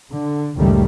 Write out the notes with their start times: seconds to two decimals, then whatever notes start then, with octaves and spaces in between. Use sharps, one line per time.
0.10 D3
0.56 C#2 F#2 A2 D#3 G3 A3